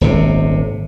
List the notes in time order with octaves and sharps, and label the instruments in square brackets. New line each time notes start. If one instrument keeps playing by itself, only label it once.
[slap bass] D#1 G#1 C3